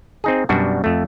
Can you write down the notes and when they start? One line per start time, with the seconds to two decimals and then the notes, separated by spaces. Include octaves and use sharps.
0.24 C4 D#4 G#4
0.49 F#2 B2 G3 D4 F#4
0.84 F2 A3